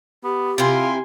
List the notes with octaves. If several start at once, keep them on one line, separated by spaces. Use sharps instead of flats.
B3 G4
C3 E4 F4 A#4 G#5 C6